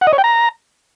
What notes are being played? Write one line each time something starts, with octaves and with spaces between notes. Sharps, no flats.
F#5
D#5
C#5
G5
A#5